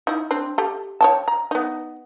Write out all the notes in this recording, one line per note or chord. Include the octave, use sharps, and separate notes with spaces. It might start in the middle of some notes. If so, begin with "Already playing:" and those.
D#4 E4
C4 D4
G4 A4
C#5 G5 A5
A#5
B3 D#4